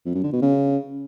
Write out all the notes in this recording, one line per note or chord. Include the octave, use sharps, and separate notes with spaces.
F2
F#2
D3
B2
C#3